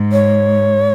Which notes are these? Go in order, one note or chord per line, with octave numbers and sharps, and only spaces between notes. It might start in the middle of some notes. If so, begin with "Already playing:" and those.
Already playing: G#2
C#5